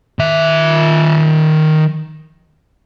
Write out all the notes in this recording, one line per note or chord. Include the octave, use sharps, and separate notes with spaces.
D#3 E5